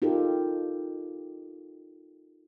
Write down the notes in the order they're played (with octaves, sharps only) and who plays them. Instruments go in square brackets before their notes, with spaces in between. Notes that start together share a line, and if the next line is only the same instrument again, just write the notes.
[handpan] D#4 F4 G4 A4 A#4